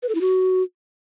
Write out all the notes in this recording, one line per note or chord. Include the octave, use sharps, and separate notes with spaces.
B4
A4
E4
F#4